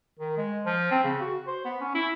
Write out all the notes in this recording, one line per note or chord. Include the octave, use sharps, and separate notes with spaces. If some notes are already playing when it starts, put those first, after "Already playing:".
D#3
G#3
F3
C4
C#3
F#4
C5
B3
C#4
E4